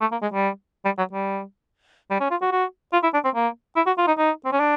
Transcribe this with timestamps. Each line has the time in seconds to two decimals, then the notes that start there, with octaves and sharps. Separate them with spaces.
0.01 A3
0.12 A#3
0.22 G#3
0.33 G3
0.85 G3
0.98 F#3
1.13 G3
2.10 G3
2.20 C#4
2.31 F4
2.42 F#4
2.52 F#4
2.93 F4
3.03 E4
3.14 D4
3.24 C4
3.35 A#3
3.76 E4
3.87 F#4
3.98 F4
4.07 D#4
4.18 D#4
4.45 C4
4.52 C#4
4.60 D4